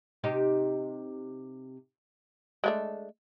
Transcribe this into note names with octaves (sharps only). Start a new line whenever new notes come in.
C3 D#4 G4
G#3 A3 D4